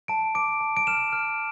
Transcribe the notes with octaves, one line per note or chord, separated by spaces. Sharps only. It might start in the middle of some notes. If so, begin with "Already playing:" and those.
A5 D7
D6 D7
A5
D7
F6 E7
F6